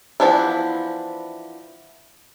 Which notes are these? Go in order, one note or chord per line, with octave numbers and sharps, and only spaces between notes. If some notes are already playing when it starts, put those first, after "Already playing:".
E3 F3 B3 D4 E4